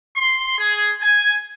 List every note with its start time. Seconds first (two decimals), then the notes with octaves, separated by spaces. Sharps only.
0.17 C6
0.59 G#4
1.01 G#5